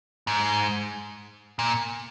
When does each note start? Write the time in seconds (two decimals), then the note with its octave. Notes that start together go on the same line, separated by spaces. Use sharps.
0.27 G#2
1.59 A#2